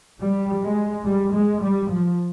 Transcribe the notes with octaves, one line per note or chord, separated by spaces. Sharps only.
G3
G#3
G3
G#3
G3
F3